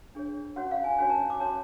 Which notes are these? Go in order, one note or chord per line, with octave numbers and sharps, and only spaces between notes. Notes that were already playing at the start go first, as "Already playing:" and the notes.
D4 G#4 C#5
C#4 F#4 C#5 F#5
F5
G#5
C#4 F#4 C#5 G#5
A5
D6
C#4 F#4 C#5 A5